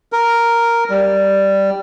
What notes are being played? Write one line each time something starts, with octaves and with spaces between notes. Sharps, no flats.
A#4
G3